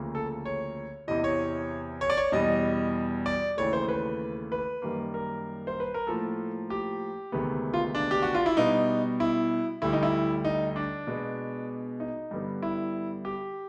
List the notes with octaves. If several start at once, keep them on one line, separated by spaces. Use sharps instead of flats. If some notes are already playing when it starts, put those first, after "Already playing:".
Already playing: D2 C#3 F3 A#3
A4
C#5
E2 C3 E3 D#5
C#5
C#5
D5
C#5
E2 B2 G3 D#5
D5
D#2 C#3 E3 A3 C#5
C5
B4
B4
F#2 D#3 G3 A#3
A#4
C5
B4
A#4
A2 F3 A#3 A4
G4
D2 C3 D#3 G#3 B3
F4
D4
G4
F#4
F4
E4
B2 G3 B3 D#4
E4
D2 D3 G3 E4
D#4
E4
D#4
D4
B2 G#3 B3
D#4
G2 D3 G3 B3
E4
G4